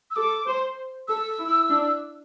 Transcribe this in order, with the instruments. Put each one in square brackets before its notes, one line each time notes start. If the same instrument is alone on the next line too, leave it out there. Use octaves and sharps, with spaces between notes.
[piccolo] E6
[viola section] A4 [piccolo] D6
[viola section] C5
[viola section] A4 [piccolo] E6
[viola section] E4
D4